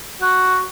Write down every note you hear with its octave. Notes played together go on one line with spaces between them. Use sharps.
F#4